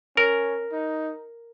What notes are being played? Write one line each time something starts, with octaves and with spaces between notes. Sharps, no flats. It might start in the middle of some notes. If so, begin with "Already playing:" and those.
C#4 A#4
D#4